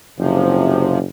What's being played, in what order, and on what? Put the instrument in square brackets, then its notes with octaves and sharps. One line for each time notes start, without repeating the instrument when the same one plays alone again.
[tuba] F#1 [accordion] C3 F3